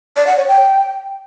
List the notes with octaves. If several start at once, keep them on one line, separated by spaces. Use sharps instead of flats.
D5
F#5
C#5
G5